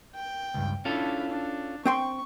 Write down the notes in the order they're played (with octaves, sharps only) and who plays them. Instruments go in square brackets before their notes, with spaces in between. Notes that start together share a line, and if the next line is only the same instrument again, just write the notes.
[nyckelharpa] G5
[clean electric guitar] C#2 G2
[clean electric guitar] C#4 F4 A4 [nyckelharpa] D4 E4
[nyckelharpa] D4
[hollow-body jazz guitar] C4 G5 C6 [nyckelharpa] C#6